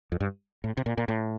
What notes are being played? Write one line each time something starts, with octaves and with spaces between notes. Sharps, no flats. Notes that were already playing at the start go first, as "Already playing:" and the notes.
F2
G2
A2
C3
A#2
A#2
A2